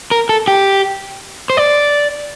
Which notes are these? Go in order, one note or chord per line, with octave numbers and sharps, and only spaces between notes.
A#4
A4
G4
C5
D5